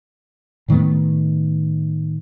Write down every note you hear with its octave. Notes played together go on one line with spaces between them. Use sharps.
A2 D#3 A3 B3